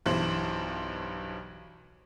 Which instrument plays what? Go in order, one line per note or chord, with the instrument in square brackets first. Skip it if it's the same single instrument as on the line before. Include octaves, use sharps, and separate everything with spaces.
[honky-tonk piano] B1 G2 E3 C5 F#7